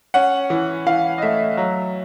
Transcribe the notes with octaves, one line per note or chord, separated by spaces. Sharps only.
C#4 F#5
E3
E3 F5
D#5
A3 E5
F#3